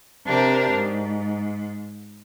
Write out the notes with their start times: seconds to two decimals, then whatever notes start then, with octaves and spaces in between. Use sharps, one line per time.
0.25 C3 D4 G4 A#4 C5
0.72 G#2